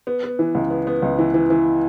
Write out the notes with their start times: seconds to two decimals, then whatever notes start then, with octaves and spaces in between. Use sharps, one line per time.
0.07 B3
0.23 B3
0.39 E3
0.55 C#2
0.71 B3
0.87 B3
1.02 C#2
1.19 E3
1.34 E3
1.50 E3